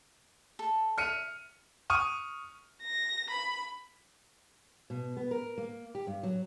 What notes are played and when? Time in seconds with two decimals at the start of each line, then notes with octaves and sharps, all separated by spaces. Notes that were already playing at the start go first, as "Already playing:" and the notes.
0.59 A4
0.98 E5 F6 C#7 D#7
1.90 C#6 D#6 F6 D#7
2.83 A#6
3.30 B5
4.90 B2
5.17 B3
5.31 A#4
5.58 A#3
5.95 G4
6.07 G2
6.23 F#3